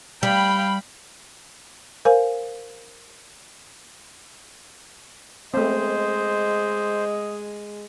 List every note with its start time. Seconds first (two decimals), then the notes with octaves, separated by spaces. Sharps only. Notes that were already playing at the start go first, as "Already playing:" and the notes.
0.23 G3 F5 G5 B5
2.05 A#4 C5 F5 G#5
5.54 G#3 A3 B3 C4 C5 D#5